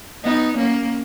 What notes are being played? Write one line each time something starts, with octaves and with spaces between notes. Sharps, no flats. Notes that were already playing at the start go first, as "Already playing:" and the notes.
B3 D#4
A#3 C#4